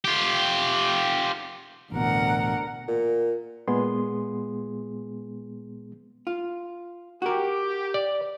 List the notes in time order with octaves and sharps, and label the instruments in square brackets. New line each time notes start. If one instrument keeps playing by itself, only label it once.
[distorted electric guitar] F4 G4
[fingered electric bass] A1 B2 [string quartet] D2 A#4 F#5
[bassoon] A#2
[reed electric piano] A#2 G#3 B3 G#4 C6
[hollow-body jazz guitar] F4
[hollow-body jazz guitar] F#4 A#4 [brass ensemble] G4
[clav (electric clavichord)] D5